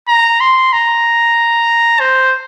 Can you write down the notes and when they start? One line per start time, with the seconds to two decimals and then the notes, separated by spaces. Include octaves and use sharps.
0.08 A#5
0.41 C6
0.73 A#5
2.00 C5